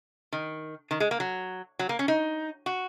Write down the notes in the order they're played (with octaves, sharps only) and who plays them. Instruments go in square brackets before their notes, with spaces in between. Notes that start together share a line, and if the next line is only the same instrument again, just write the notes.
[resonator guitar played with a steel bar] D#3
D#3
G#3
A#3
F#3
F#3
A#3
C#4
D#4
F#4